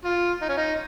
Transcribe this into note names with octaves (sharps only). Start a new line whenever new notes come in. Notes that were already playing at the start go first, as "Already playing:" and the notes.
F4
D#4
C#4
D#4